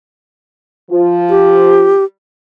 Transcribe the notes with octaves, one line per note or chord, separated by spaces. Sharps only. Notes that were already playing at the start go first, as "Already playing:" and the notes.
F3 F4
G4